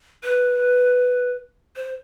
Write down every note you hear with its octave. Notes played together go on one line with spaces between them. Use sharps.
B4
C5